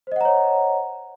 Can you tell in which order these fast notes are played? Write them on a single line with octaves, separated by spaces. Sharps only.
C5 D#5 F#5 A#5 C#5